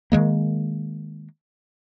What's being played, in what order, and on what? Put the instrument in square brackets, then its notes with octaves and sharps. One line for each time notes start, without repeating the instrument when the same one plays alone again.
[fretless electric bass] D#3 F3 G#3 A#3